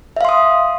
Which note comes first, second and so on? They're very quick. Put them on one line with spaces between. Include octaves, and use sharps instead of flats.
E5 F5 C6 D#6